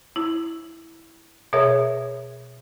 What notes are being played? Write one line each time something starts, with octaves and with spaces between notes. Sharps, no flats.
E4
B2 G#4 A#4 C#5 E5